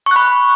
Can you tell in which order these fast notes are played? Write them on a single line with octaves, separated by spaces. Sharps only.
C#6 F#6 B5